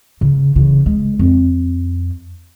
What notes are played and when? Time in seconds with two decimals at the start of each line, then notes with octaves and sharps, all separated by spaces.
0.21 C#3
0.56 C#3 E3
0.86 G#3
1.19 F2